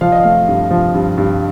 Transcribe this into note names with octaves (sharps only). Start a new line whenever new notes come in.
F3 F5
D#5
A3 F5
G2
F3
G2
G2